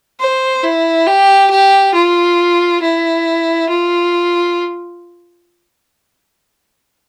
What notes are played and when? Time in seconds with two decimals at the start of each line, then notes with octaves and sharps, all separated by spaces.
0.20 C5
0.63 E4
1.07 G4
1.50 G4
1.94 F4
2.82 E4
3.69 F4